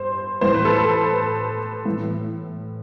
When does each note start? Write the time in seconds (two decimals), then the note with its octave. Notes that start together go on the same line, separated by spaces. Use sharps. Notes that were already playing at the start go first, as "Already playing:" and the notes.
Already playing: G2 C5
0.41 A2 E3 C5
0.54 B4
0.65 A4
0.78 B4
1.86 A2 E3